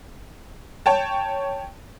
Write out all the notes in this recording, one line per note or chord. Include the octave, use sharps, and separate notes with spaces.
C#5 G5 A5